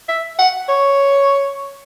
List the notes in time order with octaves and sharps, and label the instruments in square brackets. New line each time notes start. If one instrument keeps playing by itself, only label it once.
[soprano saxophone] E5
F#5
C#5